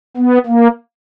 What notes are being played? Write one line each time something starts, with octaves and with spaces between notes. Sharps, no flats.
B3
A#3